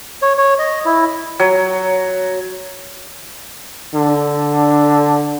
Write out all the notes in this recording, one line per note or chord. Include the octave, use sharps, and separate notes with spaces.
C#5
C#5
D#5
E4
F#3
D3